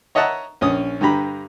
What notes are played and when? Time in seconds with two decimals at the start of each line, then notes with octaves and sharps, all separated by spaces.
0.15 C#5 D#5 E5 F#5 A5 A#5
0.61 A#1 C#4 D#6
1.01 G2 D3 G4 A#5 B5